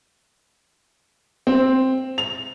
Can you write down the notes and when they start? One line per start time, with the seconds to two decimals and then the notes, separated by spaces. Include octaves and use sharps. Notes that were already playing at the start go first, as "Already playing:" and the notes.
1.47 C4
2.18 F7